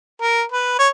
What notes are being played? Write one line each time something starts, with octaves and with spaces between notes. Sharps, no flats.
A#4
B4
C#5